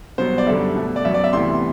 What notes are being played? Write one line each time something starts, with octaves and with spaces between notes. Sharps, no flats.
C2 B2 F#3 B3 C5
D5
F#2 D3 G3 E5
B2 A3
D5
F#2 F#3 B3 E5
D5
E5
D2 C3 E3 B3 C6